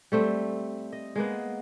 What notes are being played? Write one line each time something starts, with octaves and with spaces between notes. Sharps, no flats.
G3 A3 C4
D#5
G#3 A#3 B3